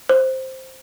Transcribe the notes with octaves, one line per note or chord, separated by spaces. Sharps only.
C5